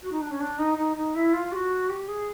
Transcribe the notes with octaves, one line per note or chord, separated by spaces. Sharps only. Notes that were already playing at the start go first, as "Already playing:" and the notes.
F#4
D#4
D4
C#4
D4
D#4
D#4
D#4
E4
F4
G4
F#4
G4
G#4